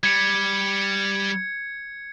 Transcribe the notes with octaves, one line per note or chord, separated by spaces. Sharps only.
G3 G#6 C#7